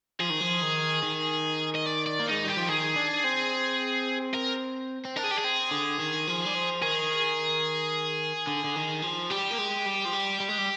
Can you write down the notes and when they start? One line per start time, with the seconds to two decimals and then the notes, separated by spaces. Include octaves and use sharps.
0.20 F3 G#4
0.30 D#3
0.41 F3
0.62 D#3
1.03 D#3
1.75 D#5
1.86 D5
2.06 D5
2.19 A#3
2.27 G#3 D#4
2.44 G3 G4
2.57 F3
2.68 D#3 G#4
2.96 D4
3.24 C4
4.33 A#4
5.05 C4
5.16 D4 A#4
5.23 G#4
5.31 G4
5.38 G#4
5.44 C4
5.71 D3
5.99 D#3
6.28 F3
6.45 G3
6.54 F3
6.82 D#3 G#4
8.47 D3
8.64 D3
8.76 D#3
9.02 F3
9.30 G3 G4
9.51 A#3
9.58 G#3
9.86 G3
10.05 F3
10.13 G3
10.40 G3
10.49 G#3
10.58 G3